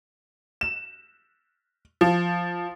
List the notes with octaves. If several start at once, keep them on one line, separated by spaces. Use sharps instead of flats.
E7
F3